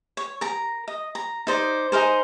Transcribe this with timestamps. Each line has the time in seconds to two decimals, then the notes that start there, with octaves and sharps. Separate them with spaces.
0.17 C#5
0.41 A#4 A#5
0.88 D#5
1.15 A#5
1.47 D#4 C5 D5
1.92 D#4 G#4 A#4 C5